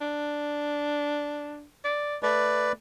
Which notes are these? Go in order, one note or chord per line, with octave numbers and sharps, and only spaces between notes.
D4
D5
A3 B4 D5